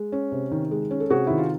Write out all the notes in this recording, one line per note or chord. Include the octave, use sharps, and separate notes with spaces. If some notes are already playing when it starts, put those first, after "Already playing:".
Already playing: G#3
C#4
C3
D#3
G#3
C#4
A4
C3 F#4 G#4
D#3 E4
F4